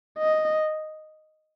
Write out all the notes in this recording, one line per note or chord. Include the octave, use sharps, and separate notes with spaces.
D#5